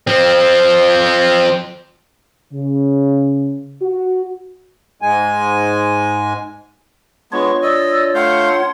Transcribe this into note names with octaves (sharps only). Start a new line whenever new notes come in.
F3 C4
C#3
F#4
G#2 G#3 G#5
G#3 B3 D4 F4 C#5 C#6
D5 D#5 E6
A3 F5 F#5 C6 G6